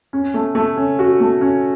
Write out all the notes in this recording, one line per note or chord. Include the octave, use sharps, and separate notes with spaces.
C#4
A3
A3
C#4
F#4
A3
C#4